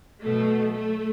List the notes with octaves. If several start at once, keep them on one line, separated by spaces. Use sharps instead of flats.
B2 F#3 A3
A3